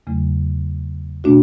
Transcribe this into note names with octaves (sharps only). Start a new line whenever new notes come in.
E2 C#3 F#3 A3
B2 A3 D4 F#4